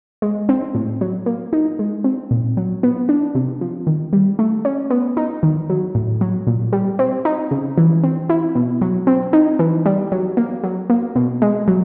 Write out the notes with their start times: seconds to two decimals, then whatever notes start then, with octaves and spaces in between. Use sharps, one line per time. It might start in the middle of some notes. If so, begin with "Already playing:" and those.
0.22 G#3
0.49 C4
0.75 A2
1.01 F#3
1.26 A#3
1.53 D#4
1.79 G#3
2.04 C4
2.31 A#2
2.57 F#3
2.83 B3
3.09 D4
3.35 C3
3.61 F3
3.87 D#3
4.13 G3
4.39 A3
4.65 C#4
4.90 B3
5.17 D#4
5.43 D#3
5.70 F#3
5.95 A2
6.21 F#3
6.47 A#2
6.73 G3
6.99 C4
7.25 D#4
7.51 C#3
7.78 E3
8.03 C4
8.29 E4
8.55 B2
8.81 F#3
9.07 C4
9.33 D#4
9.59 E3
9.86 G3
10.12 F#3
10.37 A#3
10.64 F#3
10.90 A#3
11.16 B2
11.42 G#3
11.68 F#3